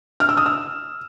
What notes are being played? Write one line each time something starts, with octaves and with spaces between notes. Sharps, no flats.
F6
E6
D#6
E6